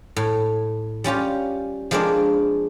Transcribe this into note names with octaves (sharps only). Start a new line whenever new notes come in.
A2
G3 C#4 F4 G4
F3 G#3 A#3 C4 D4